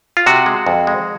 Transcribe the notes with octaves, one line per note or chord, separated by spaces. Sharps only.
F4
C3 F#4
G#3
F2
G#3